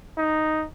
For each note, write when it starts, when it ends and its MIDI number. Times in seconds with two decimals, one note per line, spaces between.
0.18 0.65 63